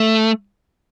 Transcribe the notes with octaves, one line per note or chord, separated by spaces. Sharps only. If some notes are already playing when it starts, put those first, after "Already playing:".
Already playing: A3